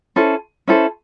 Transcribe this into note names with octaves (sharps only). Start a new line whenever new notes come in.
C#4 E4 A4 C5
C#4 E4 A4 C5